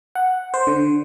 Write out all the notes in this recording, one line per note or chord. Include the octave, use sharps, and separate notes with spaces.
F#5
C5
D3